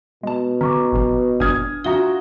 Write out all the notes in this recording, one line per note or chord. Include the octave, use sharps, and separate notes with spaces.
B2 G#3 A5
D3 C#4 A#5 C#6 D6
G1 A#2 F3
G1 F#2 A#2 D4 D#6 F6 G#6
D4 F4 F#4 E5 A#5 D#6 G7